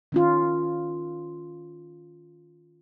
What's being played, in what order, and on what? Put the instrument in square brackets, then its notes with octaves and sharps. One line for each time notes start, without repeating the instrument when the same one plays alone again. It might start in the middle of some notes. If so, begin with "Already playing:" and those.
[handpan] D#3 C#4 F4